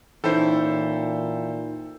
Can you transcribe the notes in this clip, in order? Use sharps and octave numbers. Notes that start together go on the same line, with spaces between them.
A#2 E3 C#4 D#4 E4 A4 C5 G5